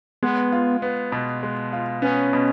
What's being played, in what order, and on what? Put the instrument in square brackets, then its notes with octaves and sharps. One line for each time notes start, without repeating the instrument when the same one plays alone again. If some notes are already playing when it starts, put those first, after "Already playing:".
[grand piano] G#3 [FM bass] B3
[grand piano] F4
B3
B2
G#3
F4
[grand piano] B3 [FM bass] C#4
[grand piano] B2